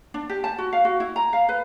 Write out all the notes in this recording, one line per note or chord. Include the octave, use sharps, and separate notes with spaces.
D4
G4
A5
F#4
F5
F#4
E4
A#5
F5
B4